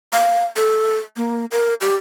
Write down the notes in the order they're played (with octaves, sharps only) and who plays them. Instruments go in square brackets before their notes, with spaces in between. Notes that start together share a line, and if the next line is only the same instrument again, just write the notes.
[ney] F5
A4
A#3
A#4
G4